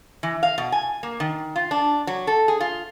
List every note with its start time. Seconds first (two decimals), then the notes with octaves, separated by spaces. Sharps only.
0.23 E3
0.43 F5
0.58 B2
0.72 G#5
1.03 A#3
1.20 D#3
1.56 F4
1.71 D4
2.07 F#3
2.27 A4
2.48 G#4
2.60 F4